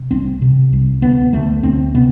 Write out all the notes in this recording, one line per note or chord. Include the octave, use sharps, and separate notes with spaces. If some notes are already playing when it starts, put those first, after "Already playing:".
Already playing: C3
C2 C4
C3
C2
D2 B3
D2 A3
D2 C4
C3 B3